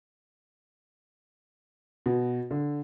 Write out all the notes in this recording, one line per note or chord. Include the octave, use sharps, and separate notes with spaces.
B2
D3